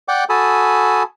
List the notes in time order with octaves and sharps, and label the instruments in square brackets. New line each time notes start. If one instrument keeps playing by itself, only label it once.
[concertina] D5 F#5 G5 D6
F#4 A4 G#5 A5 B5 D#6